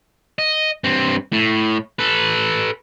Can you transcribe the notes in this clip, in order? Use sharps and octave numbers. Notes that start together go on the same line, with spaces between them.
D#5
G2 C4
A2
A4 B4